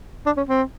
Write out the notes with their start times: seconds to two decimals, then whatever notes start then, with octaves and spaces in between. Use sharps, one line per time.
0.26 D4
0.37 C#4
0.49 C4